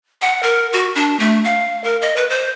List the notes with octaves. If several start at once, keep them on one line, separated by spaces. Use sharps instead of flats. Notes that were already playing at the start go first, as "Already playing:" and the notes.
F#5
A#4
F#4
D4
A3
F5
A#4
D#5
B4
C5